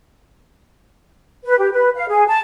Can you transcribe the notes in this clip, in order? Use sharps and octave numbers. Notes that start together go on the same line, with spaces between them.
B4
G4
B4
F5
G#4
A5